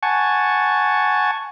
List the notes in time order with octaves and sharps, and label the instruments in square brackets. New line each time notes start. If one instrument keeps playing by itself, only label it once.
[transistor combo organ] F#5 G#5 A5 C#6